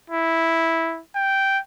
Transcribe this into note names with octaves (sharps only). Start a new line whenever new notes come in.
E4
G5